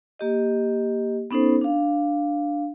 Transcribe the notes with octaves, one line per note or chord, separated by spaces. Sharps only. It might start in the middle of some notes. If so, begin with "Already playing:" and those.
A#3 G4 D#5
B3 C#4 D#4 A4 C5
D4 F5